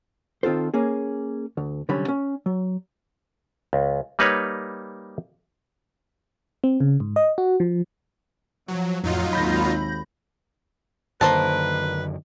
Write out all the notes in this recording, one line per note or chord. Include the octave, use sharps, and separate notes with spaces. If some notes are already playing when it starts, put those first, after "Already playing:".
D#3 C4 F4 A4 C5
A#3 C#4 G#4
D2
C2 D3 F#3 G3 C#4 B5
C#4
F#3
C#2
G3 A#3 D#4 B4 C#5
C4
C#3
G#2
D#5
F#4
F3
F3 F#3
A1 F2 F#3 D#4 F4
G#1 D#2 D#3 B5 G6 A#6
F#2 D3 D#3 A#3 B4 C5 A5